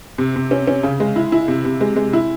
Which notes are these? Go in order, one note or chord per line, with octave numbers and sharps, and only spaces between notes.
C3
C3
C#4
C#4
C#3
G#3
E4
E4
C3
C3
G#3
G#3
E4